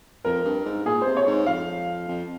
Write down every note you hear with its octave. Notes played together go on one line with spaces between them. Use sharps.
F2 A#4
G2
G#2
A#2 G#4
C3 C5
C#5
G#2
F2 F5
F2